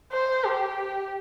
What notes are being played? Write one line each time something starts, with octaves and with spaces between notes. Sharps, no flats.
C5
G4